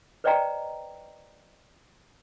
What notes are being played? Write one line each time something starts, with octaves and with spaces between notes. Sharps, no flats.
B4 C5 D5 D#5 G5 A#5